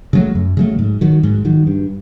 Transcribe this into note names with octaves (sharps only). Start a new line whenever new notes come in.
C#3 F#3 A3
F#2
C#3 F#3 A3
G#2
D#3 F#3
G#2
D#3 F#3
G2